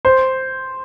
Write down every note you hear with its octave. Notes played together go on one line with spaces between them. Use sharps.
C5